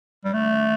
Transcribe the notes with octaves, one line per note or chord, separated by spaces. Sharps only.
G3
A3